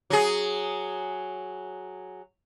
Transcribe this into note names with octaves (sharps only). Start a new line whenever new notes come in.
F#3 G#4